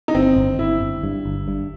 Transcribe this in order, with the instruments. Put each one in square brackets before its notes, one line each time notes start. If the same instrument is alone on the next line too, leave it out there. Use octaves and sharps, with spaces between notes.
[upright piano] D#4
[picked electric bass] G1 [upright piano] C4
[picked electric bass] G1
[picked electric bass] G1 [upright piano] E4
[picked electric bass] G1
G2
G1
G2